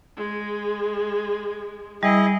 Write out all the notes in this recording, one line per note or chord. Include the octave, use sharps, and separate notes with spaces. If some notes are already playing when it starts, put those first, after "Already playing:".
G#3
G3 E4 G#4 D#5